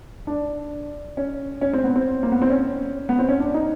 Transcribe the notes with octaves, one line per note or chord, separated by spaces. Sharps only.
D4
C#4
C#4
C4
B3
C4
A#3
B3
C4
C#4
B3
C4
C#4
D4
D#4